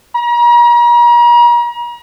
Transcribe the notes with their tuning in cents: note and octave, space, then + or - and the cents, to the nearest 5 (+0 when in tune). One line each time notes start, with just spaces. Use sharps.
A#5 +40